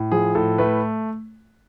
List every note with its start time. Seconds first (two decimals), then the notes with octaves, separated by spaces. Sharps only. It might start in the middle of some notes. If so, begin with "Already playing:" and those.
Already playing: A2
0.12 F3 G#4
0.35 A2 A4
0.58 A3 B4